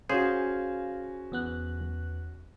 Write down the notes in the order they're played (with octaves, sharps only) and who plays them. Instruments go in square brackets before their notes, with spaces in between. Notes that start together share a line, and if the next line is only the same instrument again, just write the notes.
[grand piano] C#4 F#4 [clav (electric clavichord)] G#4 C5 [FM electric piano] F5
[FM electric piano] E2 B3 F#6